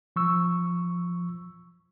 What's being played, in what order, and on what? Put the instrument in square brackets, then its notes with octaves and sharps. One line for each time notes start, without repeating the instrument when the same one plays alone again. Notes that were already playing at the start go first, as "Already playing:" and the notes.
[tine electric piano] F3 C#6 E6